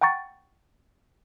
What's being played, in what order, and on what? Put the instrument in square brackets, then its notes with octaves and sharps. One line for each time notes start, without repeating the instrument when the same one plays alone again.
[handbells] F#5 G5 A#5 C#6 A6